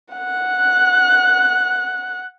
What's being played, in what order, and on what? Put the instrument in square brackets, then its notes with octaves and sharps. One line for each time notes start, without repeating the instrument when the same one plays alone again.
[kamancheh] F#5 F#6